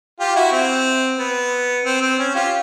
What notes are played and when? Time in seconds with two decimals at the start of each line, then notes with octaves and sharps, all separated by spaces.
0.20 F4 G4
0.36 E4 F#4
0.52 C4
1.19 B3
1.85 C4
2.01 C4
2.19 C#4
2.35 F4 G4